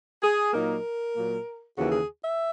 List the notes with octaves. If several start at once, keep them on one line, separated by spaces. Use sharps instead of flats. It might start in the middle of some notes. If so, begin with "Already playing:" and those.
G#4
A#2 F#3 A#3 D#4 A#4
A#2 F#3 A#3
D#2 C#3 E3 A#3 F#4
G#4
E5